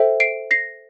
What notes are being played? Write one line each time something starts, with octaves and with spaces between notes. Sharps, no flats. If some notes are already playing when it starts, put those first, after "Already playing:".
Already playing: A4 C5 E5 G5
C7 D7
A#6 C7